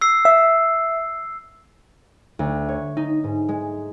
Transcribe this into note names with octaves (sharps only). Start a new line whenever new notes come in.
E6 C7
E5
D2
C#5
D#4
G#2
G#3